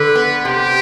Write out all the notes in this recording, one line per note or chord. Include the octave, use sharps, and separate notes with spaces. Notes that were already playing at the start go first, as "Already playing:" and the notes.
Already playing: D3 B4
B3
C3 G4